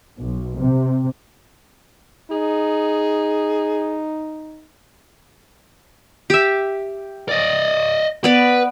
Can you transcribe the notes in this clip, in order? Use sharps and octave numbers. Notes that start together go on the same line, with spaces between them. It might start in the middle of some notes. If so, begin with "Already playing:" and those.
B1
C3
D#4 G#4
G4 E5
D5 D#5
B3 B4 D5